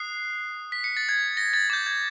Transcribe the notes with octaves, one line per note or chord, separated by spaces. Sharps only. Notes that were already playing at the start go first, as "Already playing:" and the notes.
Already playing: D#6 F#6 C7
B6
C#7
A6
G#6
A#6
A6
D6 G6 A6
G#6